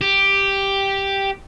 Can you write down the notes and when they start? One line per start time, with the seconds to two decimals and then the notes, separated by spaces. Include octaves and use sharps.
0.01 G4